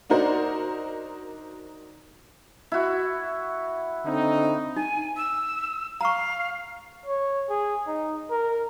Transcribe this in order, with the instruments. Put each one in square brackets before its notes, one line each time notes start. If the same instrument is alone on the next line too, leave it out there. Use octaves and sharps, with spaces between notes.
[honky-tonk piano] D4 D#4 F#4 A#4 C5 D5
[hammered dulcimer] E4 F#4
[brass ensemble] D3 C4 D#4
[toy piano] D#4 [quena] G#5
[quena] E6
[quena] F5 [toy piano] A#5 C#6
[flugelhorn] C#5
G#4
D#4
A#4